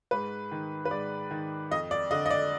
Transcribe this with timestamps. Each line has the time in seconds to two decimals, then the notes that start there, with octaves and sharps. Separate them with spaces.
0.11 G#2 B4
0.51 D#3
0.85 B4
0.91 G#2 D5
1.31 D#3
1.71 F2 D#5
1.91 D5
2.11 D3 D#5
2.26 D#5
2.31 D5